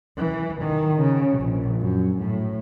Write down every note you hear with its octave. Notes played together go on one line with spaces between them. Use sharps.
E3
D#3
C#3
A#1
F#2
A2